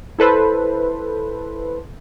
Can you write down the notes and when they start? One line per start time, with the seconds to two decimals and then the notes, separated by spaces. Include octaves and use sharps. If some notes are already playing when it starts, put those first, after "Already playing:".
0.19 E4 A4 B4 C5